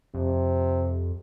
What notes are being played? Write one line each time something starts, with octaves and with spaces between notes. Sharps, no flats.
F2 C3